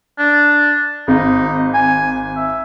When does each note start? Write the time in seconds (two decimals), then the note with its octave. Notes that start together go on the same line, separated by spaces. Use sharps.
0.18 D4
1.08 G#1 D#4
1.74 G#5
2.36 E5